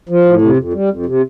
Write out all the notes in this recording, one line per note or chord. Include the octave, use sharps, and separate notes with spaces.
F3
A2
C3
F2
G3
F2
C3